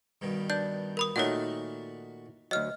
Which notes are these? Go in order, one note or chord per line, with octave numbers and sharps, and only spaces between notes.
G2 B2 D#3
D4 G6
A#4 B5 D#6
A#2 D#3 A3 F#4 C#5 F#5 A5 B5
D2 F#3 D#5 F6